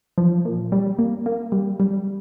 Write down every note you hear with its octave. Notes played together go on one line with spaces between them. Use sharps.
F3
A#2
G3
A#3
A#3
G3
G3